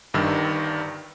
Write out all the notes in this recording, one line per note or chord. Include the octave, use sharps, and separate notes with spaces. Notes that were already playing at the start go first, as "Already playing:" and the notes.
G1 G2 D#3 E6